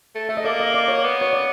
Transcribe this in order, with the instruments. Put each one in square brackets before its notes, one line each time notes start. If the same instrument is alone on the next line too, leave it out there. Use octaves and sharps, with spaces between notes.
[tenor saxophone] A3
[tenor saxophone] A3 [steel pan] E5
[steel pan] D#5
[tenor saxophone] A#3 [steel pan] D5
[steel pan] D#5
D5
C#5
[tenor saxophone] B3
[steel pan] C#5
D5